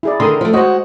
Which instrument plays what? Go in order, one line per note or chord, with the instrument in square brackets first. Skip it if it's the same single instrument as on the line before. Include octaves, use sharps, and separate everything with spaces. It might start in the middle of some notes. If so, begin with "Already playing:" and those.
[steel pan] E4 G#4 D5
[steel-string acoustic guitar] D3 D#3 A#4 [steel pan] C6 D#6
[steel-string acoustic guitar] F3 A3
[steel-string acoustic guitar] G#3 F#4 [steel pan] C5 C#5 D#5